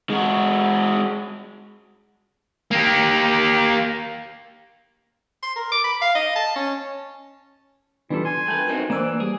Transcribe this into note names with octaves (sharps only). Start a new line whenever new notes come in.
G#3 F#4
A#3 G4
C6
A#4
D6
B5
F5
D#5
A5
C#4
E3 G3 B3 D4 F4 A4
G#5 C6
A3 B4 G5 A5 G6
F#3 C4 D#4 A#4
E3 A#3 D4 C5 G#5 D6 E6
G3 G#4